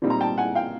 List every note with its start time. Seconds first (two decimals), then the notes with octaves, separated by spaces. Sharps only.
0.02 A#2 G3 C4 D#4
0.10 A#5
0.21 G5 A5
0.38 F#5 G#5
0.55 F5 G5